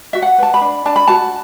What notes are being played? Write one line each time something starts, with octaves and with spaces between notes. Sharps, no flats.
F#4 E5
F#5
B4 A5
B5
D4
D4 A5
B5
F#4 A5